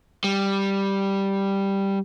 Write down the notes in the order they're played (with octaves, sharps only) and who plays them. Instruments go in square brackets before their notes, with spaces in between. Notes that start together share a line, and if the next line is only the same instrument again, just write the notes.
[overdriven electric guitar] G3